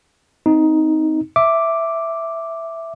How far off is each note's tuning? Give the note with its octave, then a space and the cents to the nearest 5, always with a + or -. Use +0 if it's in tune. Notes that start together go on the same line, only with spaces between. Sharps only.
C4 -15 D#4 +10
E5 +0 D6 +0